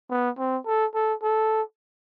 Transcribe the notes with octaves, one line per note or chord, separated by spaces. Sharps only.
B3
C4
A4
A4
A4